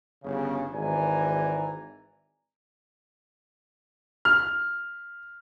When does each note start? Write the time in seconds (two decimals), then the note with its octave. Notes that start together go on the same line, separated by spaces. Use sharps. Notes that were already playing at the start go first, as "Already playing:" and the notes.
0.24 G1 C#3
0.73 G#1 E3 D5 G#5 A#5
4.25 F6